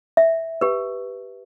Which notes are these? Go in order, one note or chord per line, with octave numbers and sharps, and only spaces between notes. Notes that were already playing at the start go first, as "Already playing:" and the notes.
E5
G4 B4